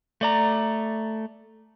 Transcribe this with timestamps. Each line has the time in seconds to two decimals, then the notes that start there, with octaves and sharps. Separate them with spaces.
0.21 A3 D5 A#5